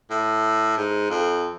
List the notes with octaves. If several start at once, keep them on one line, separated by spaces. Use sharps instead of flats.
A2
G#2
F2